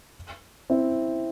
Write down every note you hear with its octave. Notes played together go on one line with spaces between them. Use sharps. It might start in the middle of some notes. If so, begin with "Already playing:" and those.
C4 E4